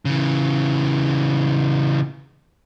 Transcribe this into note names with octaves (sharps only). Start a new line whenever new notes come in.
C#3 E3